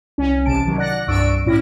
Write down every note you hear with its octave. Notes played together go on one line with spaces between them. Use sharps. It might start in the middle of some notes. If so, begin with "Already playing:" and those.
C2 C#4
A1 C3 A5 D7
C3 D#3 F#3
D5 F#5 F#6 A#6
C2 G2 D5 C#6 E6 D7
A2 C#4 E4 A#6